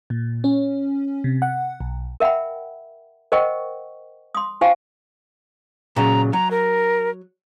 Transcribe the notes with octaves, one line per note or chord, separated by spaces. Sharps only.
A#2
C#4
C3
F#5
B1
A#4 E5 F#5 G5 B5
A#4 C5 D#5 F#5 G5 C#6
C6 D#6
F4 C5 F5 G5 G#5 C#6
A#2 C#3 F#3 A#5
F#3 A#5
A#4